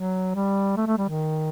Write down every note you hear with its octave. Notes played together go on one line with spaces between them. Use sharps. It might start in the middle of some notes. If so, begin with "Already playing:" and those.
Already playing: F#3
G3
A3
A3
G3
D#3